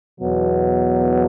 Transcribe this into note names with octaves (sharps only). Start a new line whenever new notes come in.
E2 B2 F#3